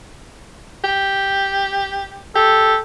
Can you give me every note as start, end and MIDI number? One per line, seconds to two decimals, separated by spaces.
0.84 2.27 67
2.36 2.76 67
2.36 2.80 69